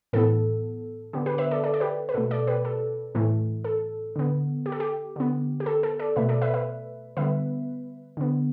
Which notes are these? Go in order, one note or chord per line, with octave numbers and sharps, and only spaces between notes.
A2 E3 B3 A4
D3 B3 G4
G4 B4
B4 E5
A4 D5
A4 D5
D5
G4 B4
B4
B2 A3 A4
A4 D5
G4 B4
A4
A2 E3 A3
A4
D3 B3
G4
A4
G4
D3 B3
G4
A4
A4
A4 D5
B2 A3 B4 E5
A4 D5
B4 E5
B4 E5
D3 G3 B3 B4 E5
D3 B3